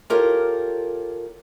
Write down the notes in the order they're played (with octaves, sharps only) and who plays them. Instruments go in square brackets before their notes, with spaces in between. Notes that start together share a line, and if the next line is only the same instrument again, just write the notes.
[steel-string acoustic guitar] F4 G4 A4 A#4 C#5